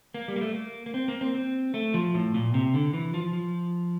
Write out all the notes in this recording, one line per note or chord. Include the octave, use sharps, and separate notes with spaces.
A#3
G3
A#3
A3
A#3
A#3
C4
A#3
C4
C4
A3
F3
A2
A#2
C3
D3
E3
F3
F3